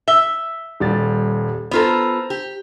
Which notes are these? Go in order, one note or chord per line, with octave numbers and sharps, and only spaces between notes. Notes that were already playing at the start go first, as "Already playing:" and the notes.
E5 G7
D#1 G3 A6
B3 F4 A4 C5 A#5
G4